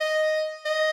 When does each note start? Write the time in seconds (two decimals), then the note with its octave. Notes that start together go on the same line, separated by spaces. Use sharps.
0.01 D#5
0.65 D#5